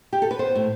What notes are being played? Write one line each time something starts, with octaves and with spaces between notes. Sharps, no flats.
G4
A4
B4
B3 C5
A2